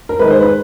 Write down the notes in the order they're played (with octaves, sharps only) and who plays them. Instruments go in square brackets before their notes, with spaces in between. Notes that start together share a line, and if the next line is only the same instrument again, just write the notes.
[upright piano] A#4
G#2 D#3 G#3 B4
C5
B4